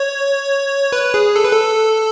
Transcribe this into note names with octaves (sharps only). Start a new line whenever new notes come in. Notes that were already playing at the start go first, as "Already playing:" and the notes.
Already playing: C#5
B4
G#4
A4
B4
A4